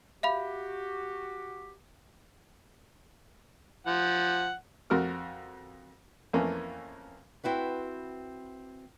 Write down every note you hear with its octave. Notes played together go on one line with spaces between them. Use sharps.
F#4 G4 E5 F5 B5
F3 F#5
F2 F#4 A#4 F6
F2 E3 A3 A#3 C#4
C4 E4 F#4 B4